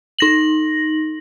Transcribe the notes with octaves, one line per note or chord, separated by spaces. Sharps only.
D#4 A#6 F#7